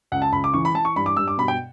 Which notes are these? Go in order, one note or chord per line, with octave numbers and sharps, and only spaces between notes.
C#2 F#5
A5
C#2 B5
D6
E3 C#6
B5
E3 A5
C#6
G2 B5
D6
G2 E6
D6
B2 B5
G5